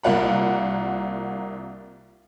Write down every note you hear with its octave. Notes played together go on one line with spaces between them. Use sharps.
C2 A#3 F4 F#5 B5